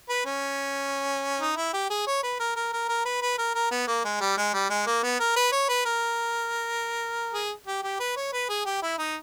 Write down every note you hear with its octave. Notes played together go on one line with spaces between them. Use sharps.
B4
C#4
D#4
E4
G4
G#4
C#5
B4
A#4
A#4
A#4
A#4
B4
B4
A#4
A#4
B3
A#3
G#3
G3
G#3
G3
G#3
A#3
B3
A#4
B4
C#5
B4
A#4
G#4
G4
G4
B4
C#5
B4
G#4
G4
E4
D#4